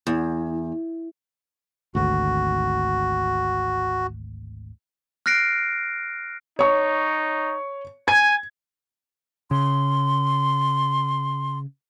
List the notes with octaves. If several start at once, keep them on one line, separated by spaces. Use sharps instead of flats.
E2
G#1 D2 F#4
F6 F#6 A#6 C7 D7
D#4 C#5 C#6
G#5 G#6
C#3 C6